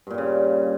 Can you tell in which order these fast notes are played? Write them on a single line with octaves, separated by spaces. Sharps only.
G2 A#2 G3 C#3